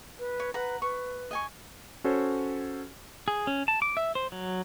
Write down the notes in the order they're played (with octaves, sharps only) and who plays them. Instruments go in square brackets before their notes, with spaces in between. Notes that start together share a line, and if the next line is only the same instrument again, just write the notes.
[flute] B4
[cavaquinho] C#5
[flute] B4 [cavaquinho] F#5 A#5
[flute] B4 [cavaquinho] C#6
[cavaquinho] D#5 G#5 C#6
[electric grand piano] C#4 F#4 A4 C5 C#5
[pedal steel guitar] G#4
C#4
A5
D6
E5
C5
F#3